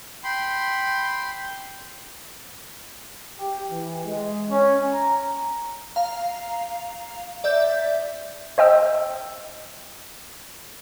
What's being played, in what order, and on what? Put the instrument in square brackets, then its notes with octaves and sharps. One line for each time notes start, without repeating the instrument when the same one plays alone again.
[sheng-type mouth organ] G5 B5 C6
[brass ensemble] G4
E3
G#3
C#4
A#5
[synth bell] F5 A#5
D5 E5 G6
[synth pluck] C5 D#5 G5 E6